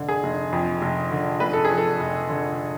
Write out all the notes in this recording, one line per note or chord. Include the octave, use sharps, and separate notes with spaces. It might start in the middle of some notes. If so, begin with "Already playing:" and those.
Already playing: F1 D3
G#4
F1
F2
F1
D3
F1 B4
A4
G#4
F2
A4
F1
D3